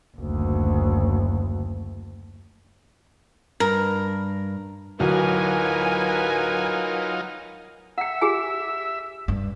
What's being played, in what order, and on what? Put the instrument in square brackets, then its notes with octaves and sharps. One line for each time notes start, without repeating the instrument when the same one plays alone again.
[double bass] F#1 D2
[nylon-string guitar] G2 [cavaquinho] A#4
[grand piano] D1 [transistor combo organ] F#3 D#4 F4 [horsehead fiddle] A#4 B4 [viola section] G#5
[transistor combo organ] E5 [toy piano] F#5 G5
[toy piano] G4 G#4 G#5
[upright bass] G2